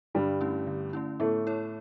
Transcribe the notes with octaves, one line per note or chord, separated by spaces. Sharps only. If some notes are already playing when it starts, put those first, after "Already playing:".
G2 D3 G3
A3 C#4 E4
D3
A3 C#4 E4
A2 A3 B3
E4 A4 C#5